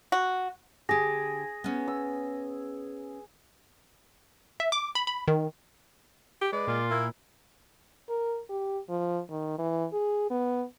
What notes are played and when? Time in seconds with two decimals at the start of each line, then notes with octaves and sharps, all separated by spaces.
0.12 F#4
0.89 D3 G4 G#4 A#6
1.64 B3 C#4
1.88 E6
4.60 E5
4.72 D6
4.95 B5
5.07 B5
5.28 D#3
6.41 G4
6.53 G#3 B4 D5
6.67 A#2 F4
6.91 A#3 E4
8.09 A#4
8.49 G4
8.89 F3
9.30 D#3
9.59 E3
9.92 G#4
10.30 B3